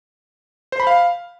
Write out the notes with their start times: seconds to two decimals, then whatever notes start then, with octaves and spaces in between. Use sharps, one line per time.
0.72 C5
0.80 B5
0.87 F5